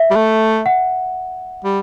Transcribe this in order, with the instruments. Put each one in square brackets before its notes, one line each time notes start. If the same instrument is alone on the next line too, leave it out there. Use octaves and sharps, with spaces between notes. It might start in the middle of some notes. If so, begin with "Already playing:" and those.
Already playing: [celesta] E5
[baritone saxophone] G3
A3
[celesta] F#5
[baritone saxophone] G3